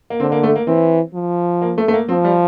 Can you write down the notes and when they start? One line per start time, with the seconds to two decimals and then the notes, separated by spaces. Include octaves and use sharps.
0.10 A#3
0.20 D3 C4
0.32 A#3
0.43 A3
0.55 A#3
0.67 E3 C4
1.14 F3
1.62 A#3
1.78 A3
1.88 A3
1.93 A#3
2.09 F3 C4
2.24 G3